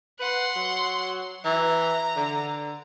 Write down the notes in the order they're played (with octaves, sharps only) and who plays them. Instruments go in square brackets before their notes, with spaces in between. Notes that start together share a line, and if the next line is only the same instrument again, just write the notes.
[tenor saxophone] B4 [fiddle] F#5 C6
[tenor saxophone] F#3
[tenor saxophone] E3 [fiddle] A#5
[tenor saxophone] D3